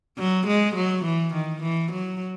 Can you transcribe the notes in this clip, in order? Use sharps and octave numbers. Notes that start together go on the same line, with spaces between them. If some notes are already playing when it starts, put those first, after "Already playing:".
F#3
G#3
F#3
E3
D#3
E3
F#3